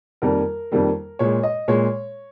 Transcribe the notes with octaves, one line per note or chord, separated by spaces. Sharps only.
F2 D#3 G3 A#3 A#4
F2 D#3 G3 A#3
A#2 G#3 C#5
D#5
A#2 G#3 C#5